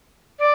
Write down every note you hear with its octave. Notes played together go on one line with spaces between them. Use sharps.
D5